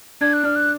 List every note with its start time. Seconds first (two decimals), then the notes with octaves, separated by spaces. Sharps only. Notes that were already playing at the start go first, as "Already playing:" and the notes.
0.21 D4 G#6
0.33 F#6
0.43 D4 F6
0.56 F#6